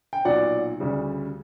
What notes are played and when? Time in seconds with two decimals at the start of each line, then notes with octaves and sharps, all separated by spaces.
0.13 G5
0.25 B1 A#2 F#3 D5 F#5
0.80 D2 C#3 G3